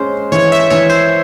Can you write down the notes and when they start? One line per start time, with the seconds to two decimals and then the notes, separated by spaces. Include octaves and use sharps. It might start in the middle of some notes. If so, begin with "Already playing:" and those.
Already playing: G#3 C#4 C5
0.32 E3 C#5
0.52 E5
0.70 E3 C#5
0.90 C5